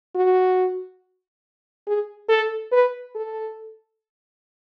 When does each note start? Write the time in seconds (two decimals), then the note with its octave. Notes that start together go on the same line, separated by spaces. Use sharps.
0.15 F#4
1.87 G#4
2.29 A4
2.72 B4
3.15 A4